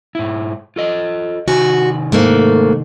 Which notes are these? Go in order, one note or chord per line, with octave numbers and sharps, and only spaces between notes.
G#2 E4
F4 A4 D#5
C3 D#3 F#4 G#5
G#2 A3 A#3